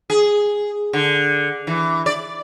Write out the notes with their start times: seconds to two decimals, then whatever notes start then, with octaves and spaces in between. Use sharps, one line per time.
0.10 G#4
0.93 D3
1.67 E3
2.06 D5